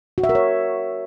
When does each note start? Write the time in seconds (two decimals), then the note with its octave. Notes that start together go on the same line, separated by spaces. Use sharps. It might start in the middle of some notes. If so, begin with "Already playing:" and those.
0.18 F#4
0.24 E5
0.29 A#4
0.35 C#5